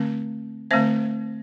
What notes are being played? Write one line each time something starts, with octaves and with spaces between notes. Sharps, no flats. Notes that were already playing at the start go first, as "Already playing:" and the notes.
Already playing: D3 A3 C4
D3 A3 C4 C5 E5